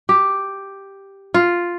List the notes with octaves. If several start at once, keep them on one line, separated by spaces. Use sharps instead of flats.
G4
F4